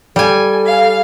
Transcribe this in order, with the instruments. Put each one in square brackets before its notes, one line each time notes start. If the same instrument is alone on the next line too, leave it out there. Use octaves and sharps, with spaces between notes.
[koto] G3 G#5 [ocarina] A4
[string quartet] F5